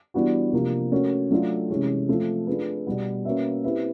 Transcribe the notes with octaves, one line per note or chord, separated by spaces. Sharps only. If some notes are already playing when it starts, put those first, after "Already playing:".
E3 G3 B3 D4 F#4
C3 F3 A#3 D4
A3 C#4 F#4 A#4
F#3 A3 D4 F4 A4
C3 E3 G#3 C#4
F3 A3 C4 F4
A3 D4 F4 G#4 B4
B2 G3 B3
A#3 C#4 F#4 B4 E5
C4 E4 G4 B4 E5